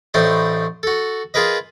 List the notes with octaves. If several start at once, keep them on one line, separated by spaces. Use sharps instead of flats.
A1 A2 D4 D#4 C5 C6
F#4 A4
F4 G#4 A#4 B4 D#5